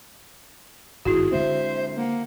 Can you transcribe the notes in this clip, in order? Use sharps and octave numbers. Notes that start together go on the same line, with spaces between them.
G#1 G2 D#3 E4 F#4 G#4
D3 G#3 C4 C5 E5
A#3 F#5